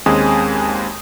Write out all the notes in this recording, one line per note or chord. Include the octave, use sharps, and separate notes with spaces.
D#2 G#3 C4 C#4 G#5 D#6